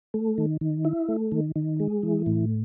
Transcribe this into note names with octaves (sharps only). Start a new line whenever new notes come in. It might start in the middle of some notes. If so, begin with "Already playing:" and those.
A3
D#3
D#3
E4
A3
D#3
D#3
G#3
E3
A2